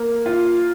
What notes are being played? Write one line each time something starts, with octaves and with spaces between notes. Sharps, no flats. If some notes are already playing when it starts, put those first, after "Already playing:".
Already playing: A#3
F4